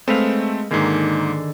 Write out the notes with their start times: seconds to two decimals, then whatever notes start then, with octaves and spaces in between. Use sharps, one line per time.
0.08 G#3 A3 C4 B4 F5
0.71 G#2 D3 D#3 A#3 G#4